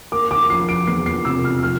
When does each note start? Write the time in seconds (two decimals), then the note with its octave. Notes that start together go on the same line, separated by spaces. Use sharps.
0.12 A#3 D6
0.31 D6
0.50 F3 C7
0.69 D7
0.87 E2 C7
1.06 C7
1.25 C3 E6
1.44 F6
1.63 F3 F6